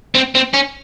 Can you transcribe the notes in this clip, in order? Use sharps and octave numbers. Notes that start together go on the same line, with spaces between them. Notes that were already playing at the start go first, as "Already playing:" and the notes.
C4
C4
C#4